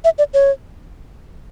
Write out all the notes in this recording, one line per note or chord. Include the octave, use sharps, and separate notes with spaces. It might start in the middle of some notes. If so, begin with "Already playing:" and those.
E5
D5
C#5